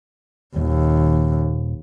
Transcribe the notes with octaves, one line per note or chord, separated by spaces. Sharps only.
D#1 D#2